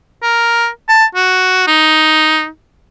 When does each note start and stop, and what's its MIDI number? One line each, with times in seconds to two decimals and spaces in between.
0.23 0.67 70
0.89 1.05 81
1.15 1.66 66
1.67 2.47 63